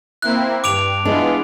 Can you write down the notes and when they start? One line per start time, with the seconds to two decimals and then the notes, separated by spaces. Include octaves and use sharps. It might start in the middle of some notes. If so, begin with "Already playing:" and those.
0.22 A#3 C4 E4 F#6
0.64 G2 D6 D7 F7
1.05 E3 G#3 B3 D4 F4